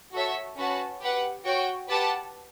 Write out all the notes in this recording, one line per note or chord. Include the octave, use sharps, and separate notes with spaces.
F#4 A4 C#5 E5
C#4 F#4 B4 F#5 A5
G4 B4 F#5
F#4 C#5 G5
G4 B4 F#5 A5